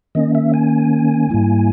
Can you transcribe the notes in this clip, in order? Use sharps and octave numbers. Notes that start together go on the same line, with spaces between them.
D#3 A#3 C#4 D#5
E5
G#5
G#2 G3 A#3 E4